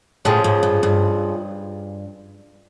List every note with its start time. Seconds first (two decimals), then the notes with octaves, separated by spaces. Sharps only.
0.25 A2 C#3 F3 G#3
0.44 G#2
0.63 G2
0.83 G2